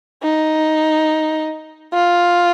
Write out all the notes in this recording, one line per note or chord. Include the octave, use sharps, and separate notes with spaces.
D#4
F4